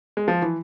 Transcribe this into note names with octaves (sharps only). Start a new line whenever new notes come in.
G#3
F3
E3